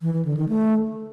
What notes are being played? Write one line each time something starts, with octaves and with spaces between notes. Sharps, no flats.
E3
E3
D3
D#3
A3